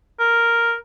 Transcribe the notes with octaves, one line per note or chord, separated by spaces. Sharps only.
A#4